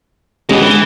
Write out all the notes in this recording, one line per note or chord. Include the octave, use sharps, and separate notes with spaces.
B2 E3 G#3 C#4 G4
D2 E3